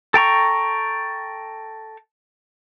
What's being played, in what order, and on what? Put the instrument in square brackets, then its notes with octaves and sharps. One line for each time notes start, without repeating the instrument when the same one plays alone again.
[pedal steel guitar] A4 G5 A#5 C#6